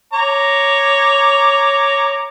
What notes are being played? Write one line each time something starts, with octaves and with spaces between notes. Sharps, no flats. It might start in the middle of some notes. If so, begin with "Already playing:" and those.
C#5 A#5 D6